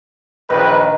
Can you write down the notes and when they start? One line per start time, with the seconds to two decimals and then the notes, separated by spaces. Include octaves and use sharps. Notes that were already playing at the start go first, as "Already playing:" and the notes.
0.50 A#1 D#3 B4